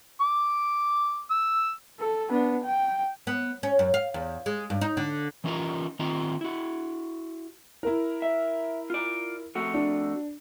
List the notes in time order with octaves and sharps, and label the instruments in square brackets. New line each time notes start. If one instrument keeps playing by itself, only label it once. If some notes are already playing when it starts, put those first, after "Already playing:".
[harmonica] D6
E6
[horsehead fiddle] A4
B3 D4
G5
[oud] B3
C#4
F#2
F5
E2
G#3
G2
D#4
D3
[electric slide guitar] E3 C#4 D#4 F4 A#4 A#5
D#3 C4 D#4 F4 A#5
E4 F#4
[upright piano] E4 A#4
[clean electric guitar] E5
F4 D5
F2 A3 F#4
[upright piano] D4